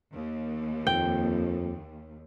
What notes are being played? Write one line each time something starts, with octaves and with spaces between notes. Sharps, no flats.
D#2
F2 G5